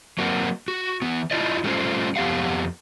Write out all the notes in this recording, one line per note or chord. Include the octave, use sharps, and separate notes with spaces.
F#3 A#3 C4 F#4
F#4
E3 B3
E4 F4 D5 D#5
F#3 G3 A3 C#4 F4 C5
F2 B3 G4 F5 F#5